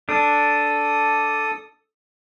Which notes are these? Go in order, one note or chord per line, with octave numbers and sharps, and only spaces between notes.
D4 A4 D#6